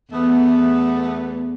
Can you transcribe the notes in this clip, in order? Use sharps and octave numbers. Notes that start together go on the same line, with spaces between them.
E2 A3 B3